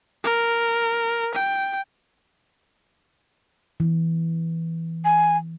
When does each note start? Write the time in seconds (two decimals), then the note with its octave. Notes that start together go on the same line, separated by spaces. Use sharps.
0.24 A#4
1.34 G5
3.80 E3
5.05 G#5